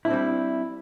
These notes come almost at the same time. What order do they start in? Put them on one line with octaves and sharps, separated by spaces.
E4 D4 C4 G3